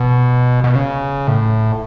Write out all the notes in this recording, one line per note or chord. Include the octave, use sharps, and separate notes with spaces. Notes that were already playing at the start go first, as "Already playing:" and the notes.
Already playing: B2
B2
C#3
A2